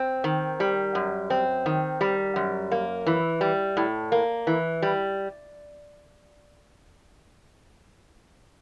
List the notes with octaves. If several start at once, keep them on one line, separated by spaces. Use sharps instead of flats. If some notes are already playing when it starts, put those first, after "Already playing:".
Already playing: C4
D#3
G3
F#2
C4
D#3
G3
F#2
A#3
E3
G3
A2
A#3
E3
G3